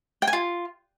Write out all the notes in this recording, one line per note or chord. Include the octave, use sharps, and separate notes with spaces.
G5
G#5
F4